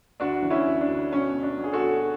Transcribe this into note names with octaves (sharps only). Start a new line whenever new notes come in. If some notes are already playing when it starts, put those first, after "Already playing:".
D2 D4 F#4
E3
C#4 E4
D2
D4
D2
B1 C#4
B1
D4
B1
G#4
F#4 A4
B1